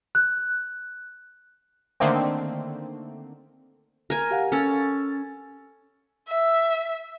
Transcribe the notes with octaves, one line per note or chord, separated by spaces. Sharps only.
F#6
D3 D#3 A3 A#3 C4
A#4 G#5
G4 F5 F#5
C#4 A4 E6 A6
E5